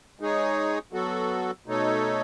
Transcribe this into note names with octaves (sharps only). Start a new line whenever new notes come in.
G#3 D#4 G#4 C#5
F#3 B3 F#4 A4
B2 A3 D#4 A4 C#5